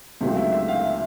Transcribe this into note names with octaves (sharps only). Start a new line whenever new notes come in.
C#2 C3 D#3 F#3 A3
E5
E5
F5